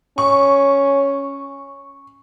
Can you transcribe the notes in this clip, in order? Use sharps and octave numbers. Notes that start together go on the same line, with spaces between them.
C#4 C#6